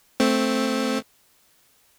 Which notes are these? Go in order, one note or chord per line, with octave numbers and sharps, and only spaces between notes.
A3 C4